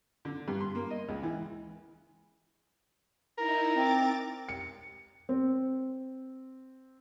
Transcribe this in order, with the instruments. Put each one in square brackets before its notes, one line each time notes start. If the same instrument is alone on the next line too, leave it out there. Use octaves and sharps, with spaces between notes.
[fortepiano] D3
G2
C6
A#3
D#5
C#2
E3
[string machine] D#4 E4 [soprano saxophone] A#4
[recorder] C4 [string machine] D6 A6
[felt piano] C#7
C4